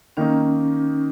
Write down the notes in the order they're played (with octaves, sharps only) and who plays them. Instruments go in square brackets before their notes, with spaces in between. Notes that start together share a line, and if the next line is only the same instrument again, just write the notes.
[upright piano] D#3 A#3 D#4 [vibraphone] C#4